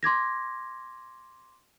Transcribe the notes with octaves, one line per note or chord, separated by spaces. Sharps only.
C6 D6 G#6 A#6